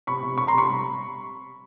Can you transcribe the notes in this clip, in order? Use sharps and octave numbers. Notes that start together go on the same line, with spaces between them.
C3 B5 C#6
C3
C3 B5 C#6
A#5 C6
C3
B5 C#6
G3